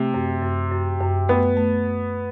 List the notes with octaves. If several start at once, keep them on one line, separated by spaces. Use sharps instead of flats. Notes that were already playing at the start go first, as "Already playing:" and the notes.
Already playing: C3 A3
F#2
F#2
F#2
F#2
A3 B3
A3
F#2